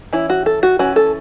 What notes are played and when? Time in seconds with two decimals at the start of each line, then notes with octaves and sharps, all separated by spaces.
0.13 E3 C#4 E4
0.30 F#4
0.46 A4
0.63 F#4
0.79 E3 C#4 F#4
0.96 A4